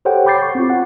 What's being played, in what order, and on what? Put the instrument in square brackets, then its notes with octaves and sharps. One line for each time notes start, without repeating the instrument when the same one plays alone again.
[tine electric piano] G4 A4 C5 C#5 F#5 G5
B5 D6 G6 A6 C7
C#6
C4 F4
F#5